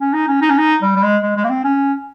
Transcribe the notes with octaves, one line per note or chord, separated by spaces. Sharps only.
C#4
D#4
C#4
D#4
C#4
D#4
G3
G3
G#3
G#3
G#3
A#3
C4
C#4